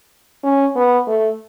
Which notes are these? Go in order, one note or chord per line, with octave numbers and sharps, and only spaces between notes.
C#4
B3
A3